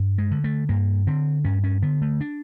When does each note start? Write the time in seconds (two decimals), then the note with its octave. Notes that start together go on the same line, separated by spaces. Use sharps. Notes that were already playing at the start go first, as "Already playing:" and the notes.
Already playing: G2
0.18 G#3
0.31 D3
0.44 A3
0.69 G2 A#3
1.07 D3 C4
1.44 G2 C#4
1.64 C#4
1.82 D3 B3
2.02 A3
2.21 D4